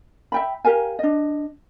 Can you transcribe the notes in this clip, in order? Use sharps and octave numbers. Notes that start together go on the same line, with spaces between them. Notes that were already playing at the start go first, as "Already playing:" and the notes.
E5 G5 B5
G4 A#4 F5 G#5
D4 D#5